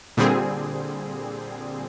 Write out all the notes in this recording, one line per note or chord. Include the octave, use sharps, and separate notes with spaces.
A#2 D3 G3 C4 G#4